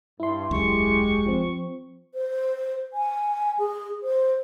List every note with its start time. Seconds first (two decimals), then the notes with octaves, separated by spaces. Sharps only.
0.20 G2 E4 C6
0.51 E1 C#2 F#2 G#3 G4 C#6
1.26 F3 C4
2.14 C5
2.93 G#5
3.59 G#4
4.03 C5